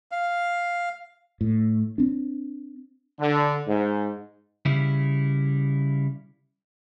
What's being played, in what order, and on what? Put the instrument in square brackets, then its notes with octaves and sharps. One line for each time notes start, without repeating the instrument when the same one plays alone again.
[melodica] F5
[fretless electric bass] A2
C4 D4
[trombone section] D3
G#2
[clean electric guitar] C#3 G3 E4